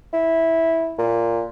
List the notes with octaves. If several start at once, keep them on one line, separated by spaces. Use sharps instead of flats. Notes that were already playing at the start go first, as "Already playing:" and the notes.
E4
A#2